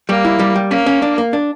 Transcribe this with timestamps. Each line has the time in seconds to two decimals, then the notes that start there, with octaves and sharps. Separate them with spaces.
0.08 G3 A#3
0.25 E4
0.39 G3
0.55 G3
0.71 A#3 C#4
0.86 C#4
1.02 D4
1.18 A#3
1.33 D4